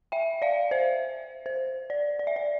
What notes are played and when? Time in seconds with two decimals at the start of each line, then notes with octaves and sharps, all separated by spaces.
0.12 E5 G5
0.42 D5 F5
0.71 C5 E5
1.46 C5
1.90 D5
2.19 D5
2.27 E5
2.36 D5